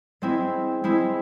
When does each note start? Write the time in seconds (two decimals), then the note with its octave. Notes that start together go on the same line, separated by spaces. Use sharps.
0.22 G#3 C4 E4
0.84 G#3 C4 E4